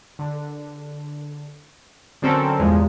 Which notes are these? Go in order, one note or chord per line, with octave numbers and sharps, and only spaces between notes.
D3
D3 F#3 C4 C#4 A4 A#4
E2 G2 A#2 F3 G#3